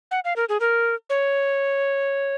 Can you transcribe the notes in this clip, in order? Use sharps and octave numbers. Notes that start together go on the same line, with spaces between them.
F#5
F5
A#4
G#4
A#4
C#5